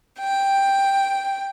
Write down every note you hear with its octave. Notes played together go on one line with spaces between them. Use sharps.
G5